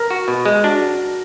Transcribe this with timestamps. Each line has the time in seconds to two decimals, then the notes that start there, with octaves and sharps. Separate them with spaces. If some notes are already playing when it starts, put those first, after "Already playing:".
Already playing: A#4
0.10 F#4
0.28 B2
0.46 G#3
0.63 D4 F#4